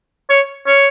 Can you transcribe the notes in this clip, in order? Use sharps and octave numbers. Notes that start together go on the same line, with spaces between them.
C#5
C#5